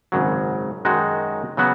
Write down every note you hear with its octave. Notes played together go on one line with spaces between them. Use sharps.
G#1 F#2 C#3 F#3
F#2 D#3 G#3 D#4 F#4
C#3 F#3 B3 F#4